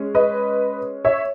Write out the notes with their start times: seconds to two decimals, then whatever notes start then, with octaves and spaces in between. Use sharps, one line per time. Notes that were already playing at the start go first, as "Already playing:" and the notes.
Already playing: G#3 C#4
0.15 B4 D#5
1.05 C#5 E5